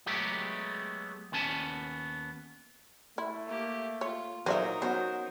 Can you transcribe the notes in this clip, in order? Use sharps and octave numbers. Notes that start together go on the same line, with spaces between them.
F#3 G#3 A3 B3 G4
D#2 B3 C#4 G#5 A5
A3 E4
A#3 G4
F4 C#5
A#2 F#3 D#4 A#4 C5 D5 E5
F#3 B3 C#4 F#4 C5